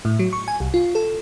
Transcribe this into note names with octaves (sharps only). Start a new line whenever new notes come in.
A2
F#3
C#6
G#5
C2
F4
A4